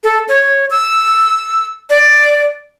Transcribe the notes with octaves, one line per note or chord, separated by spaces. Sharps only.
A4
C#5
E6
D5